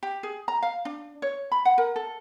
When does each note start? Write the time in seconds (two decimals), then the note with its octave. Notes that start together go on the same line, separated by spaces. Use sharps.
0.03 G4
0.23 G#4
0.48 A#5
0.62 F5
0.85 D4
1.22 C#5
1.52 B5
1.65 F#5
1.78 A#4
1.96 A4